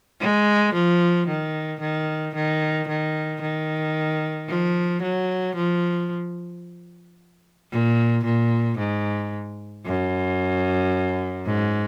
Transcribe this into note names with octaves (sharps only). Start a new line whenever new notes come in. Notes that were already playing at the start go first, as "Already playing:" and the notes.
G#3
F3
D#3
D#3
D#3
D#3
D#3
F3
F#3
F3
A#2
A#2
G#2
F#2
G#2